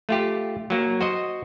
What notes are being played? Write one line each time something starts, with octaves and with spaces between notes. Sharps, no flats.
A3 F4 G4
F#3 A#3
F#4 C5 D#5